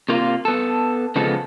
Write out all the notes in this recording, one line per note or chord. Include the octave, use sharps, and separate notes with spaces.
C3 A#3 F4
B3 A4
C#3 F3 G#3 B3 A4